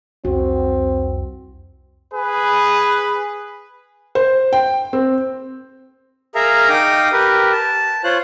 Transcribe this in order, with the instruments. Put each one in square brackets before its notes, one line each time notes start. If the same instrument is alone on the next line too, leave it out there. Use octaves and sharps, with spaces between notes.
[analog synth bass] C2 [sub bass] F2 [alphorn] C4 [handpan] F#4
[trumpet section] G#4 B4
[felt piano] C5
G5
C4
[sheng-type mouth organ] G#4 A#4 E5 F5 A#5
D#4 F5 G5 D6 D#6
G4 A#4 B4
A5
F4 C5 C#5 F#6